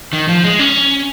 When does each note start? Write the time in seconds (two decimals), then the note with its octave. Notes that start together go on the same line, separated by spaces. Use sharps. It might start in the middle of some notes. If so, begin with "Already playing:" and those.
0.13 D#3
0.28 F3
0.44 G#3
0.59 C#4